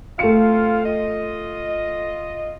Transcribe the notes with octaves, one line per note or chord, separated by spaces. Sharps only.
A3 C4 F4 F5 C#7
F4 D#5